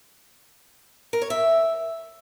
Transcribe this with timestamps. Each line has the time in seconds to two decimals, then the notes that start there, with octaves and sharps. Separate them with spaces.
1.13 A#4
1.22 C#5
1.30 E5